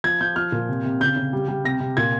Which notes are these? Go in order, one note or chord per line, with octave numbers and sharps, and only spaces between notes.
F3 G#6
F3 G6
F3 F6
A#2
C3
C3
C#3 G6
C#3
G3
G3
C3 A#6
C3
A#2 G#6